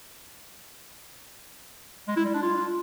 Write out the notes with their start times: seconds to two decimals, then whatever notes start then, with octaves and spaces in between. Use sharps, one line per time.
2.08 G#3
2.16 E4
2.25 G3
2.34 D4
2.42 F4